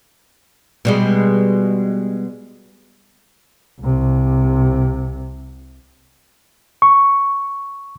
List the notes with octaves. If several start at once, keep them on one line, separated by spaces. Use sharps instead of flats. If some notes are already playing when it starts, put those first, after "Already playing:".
B2 G3 G#3
C2 C3
C#6